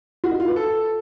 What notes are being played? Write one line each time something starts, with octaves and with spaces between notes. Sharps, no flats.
F#4
D#4
F4
B4
A4